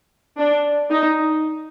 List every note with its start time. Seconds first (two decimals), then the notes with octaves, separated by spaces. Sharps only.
0.38 D4
0.90 D#4